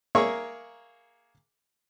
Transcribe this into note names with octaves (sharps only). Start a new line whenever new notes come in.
A#3 G#4 A#4 C#5 E5